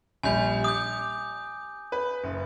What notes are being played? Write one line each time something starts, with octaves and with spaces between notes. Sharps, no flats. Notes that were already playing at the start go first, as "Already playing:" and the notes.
A#1 G3 G#5 G6 F7
D6 D#6 G6
B4
F#1